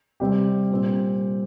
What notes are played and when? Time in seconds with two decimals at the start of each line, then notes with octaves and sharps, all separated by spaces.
0.20 C3 G3 C4 G4
0.71 A#2 G3 C4